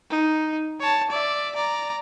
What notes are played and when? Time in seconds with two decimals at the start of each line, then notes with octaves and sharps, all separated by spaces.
0.10 D#4
0.80 C#5 A5
1.10 D5 E5
1.55 D5 A#5